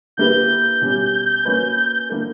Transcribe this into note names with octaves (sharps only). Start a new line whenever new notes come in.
D3 A#3 E4 G4 B4 G6
B2 G3 C#4
A#3 C#4 F#4 B4
D3 A#3 E4 A#4